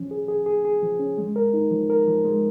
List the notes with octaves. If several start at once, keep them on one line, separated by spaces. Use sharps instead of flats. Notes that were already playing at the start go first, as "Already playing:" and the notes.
Already playing: F3 C#4
G#4
G#4
G#4
G#4
F3
C#4
G#3
A#4
D#4
F3
A#4
F3
G#3